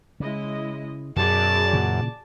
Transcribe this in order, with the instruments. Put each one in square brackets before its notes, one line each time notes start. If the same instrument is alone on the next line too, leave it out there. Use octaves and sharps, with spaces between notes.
[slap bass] C#3 [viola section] G#3 E4 D#5
[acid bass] F#2 [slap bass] B2 [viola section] F#4 G#4 D5 [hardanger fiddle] A5
[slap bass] A#2 C#3 E3